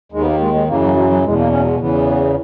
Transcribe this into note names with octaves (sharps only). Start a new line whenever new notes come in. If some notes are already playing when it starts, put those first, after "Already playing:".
D#2 D#3 G#3
B3
A#3
G#3
G#3
F#2 C#3 E3 A#3
F#3
F#3
F#3
E2 B2 G#3
A#3
C#4
F#3
G#3
E2 C#3 E3 B3